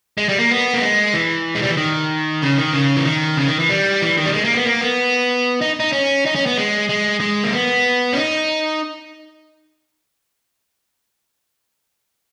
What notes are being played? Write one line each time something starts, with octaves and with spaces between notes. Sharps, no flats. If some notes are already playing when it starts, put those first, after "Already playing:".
G#3
G3
A#3
B3
A#3
G#3
E3
G#3
G3
E3
D#3
C#3
D#3
C#3
E3
D#3
C#3
D#3
E3
G3
E3
D#3
G3
G#3
A#3
B3
A#3
B3
D#4
D#4
C#4
D#4
C#4
B3
G#3
G#3
G#3
A#3
B3
C#4
D#4